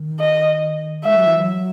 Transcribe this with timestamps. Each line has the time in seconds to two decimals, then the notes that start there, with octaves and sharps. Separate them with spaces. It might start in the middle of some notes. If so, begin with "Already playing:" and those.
Already playing: D#3
0.20 D#5
1.05 G#3 E5
1.16 F#3
1.26 E3
1.37 F#3